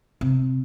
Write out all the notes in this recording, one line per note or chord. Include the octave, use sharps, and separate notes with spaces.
C3